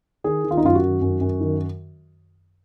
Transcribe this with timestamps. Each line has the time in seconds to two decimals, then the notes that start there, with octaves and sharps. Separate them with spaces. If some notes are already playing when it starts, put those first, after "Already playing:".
0.24 D#3 G#4
0.44 D#3
0.51 F4
0.57 D#4
0.64 F#2 F4
0.75 F#4
0.82 D#3
1.01 F#2
1.21 F#2
1.40 D#3